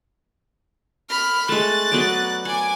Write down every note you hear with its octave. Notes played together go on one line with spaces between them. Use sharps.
B5 F6
G#3 A3 F#6 A6
F#3 B3 D5
F#5 G#5 D6